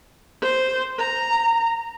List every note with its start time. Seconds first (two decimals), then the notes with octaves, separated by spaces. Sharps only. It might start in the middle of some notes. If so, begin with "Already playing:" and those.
0.42 C5
0.99 A#5